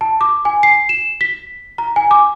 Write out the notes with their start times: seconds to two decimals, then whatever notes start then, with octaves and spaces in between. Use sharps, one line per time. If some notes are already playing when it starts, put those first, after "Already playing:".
0.01 A5
0.21 D6
0.45 G#5
0.63 C7
0.89 E7
1.21 B6
1.78 A#5
1.96 G#5
2.11 D6